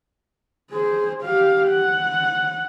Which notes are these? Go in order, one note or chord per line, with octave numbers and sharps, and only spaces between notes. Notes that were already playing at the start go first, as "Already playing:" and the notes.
G#4 C5
G4 F5
F#5